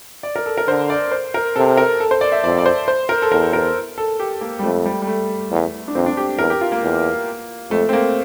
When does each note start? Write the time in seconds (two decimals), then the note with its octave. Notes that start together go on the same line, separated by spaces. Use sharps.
0.23 D5
0.36 A#4
0.46 A4
0.57 A#4
0.68 D3 C5
0.90 D5
1.12 C5
1.34 A#4
1.56 C3 A4
1.77 A#4
2.00 A4
2.11 C5
2.21 D5
2.32 E5
2.44 F2 D5
2.58 D5
2.66 C5
2.88 C5
3.09 A#4
3.22 A4
3.32 E2 A#4
3.53 A#4
3.98 A4
4.20 G4
4.41 A#3
4.59 G3
4.63 F2 A3
4.86 G3
5.02 G3
5.07 A3
5.51 E2
5.88 D4
5.95 F2 C4
6.06 D4
6.17 G4
6.39 E2 A#4
6.50 G4
6.61 F4
6.72 A#3
6.83 E2
7.71 F2 A3
7.89 C4
7.93 A#3